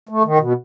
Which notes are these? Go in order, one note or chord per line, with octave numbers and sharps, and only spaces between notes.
A3
D#3
B2